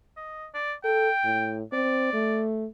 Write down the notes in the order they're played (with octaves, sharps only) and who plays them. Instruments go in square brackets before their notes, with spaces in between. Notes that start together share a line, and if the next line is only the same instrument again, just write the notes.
[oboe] D#5
D5
[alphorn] A4 [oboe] G5
[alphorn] A2
[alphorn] C4 [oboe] D5
[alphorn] A3